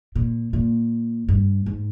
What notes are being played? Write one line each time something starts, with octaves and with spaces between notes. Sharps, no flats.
A#2
A#2
G2
G#2